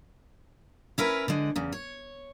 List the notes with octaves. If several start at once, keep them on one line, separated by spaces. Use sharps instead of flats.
C#4 E4 A#4 B4
D3 G#3
E2 C#3
C#5